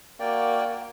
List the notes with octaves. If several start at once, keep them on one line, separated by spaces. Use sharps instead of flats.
A#3 F#4 D5 G5